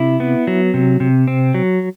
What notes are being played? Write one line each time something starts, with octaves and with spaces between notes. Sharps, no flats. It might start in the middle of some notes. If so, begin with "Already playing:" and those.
Already playing: C3 E4
B3
F#3
C3
C3
C4
F#3